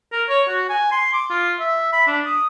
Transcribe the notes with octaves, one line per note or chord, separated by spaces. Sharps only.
A#4
C#5
F#4
G#5
C6
D6
F4
E5
B5
D4
D#6